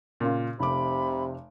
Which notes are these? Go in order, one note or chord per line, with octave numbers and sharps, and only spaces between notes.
A#2 C#3 F4
F1 C3 B5 D6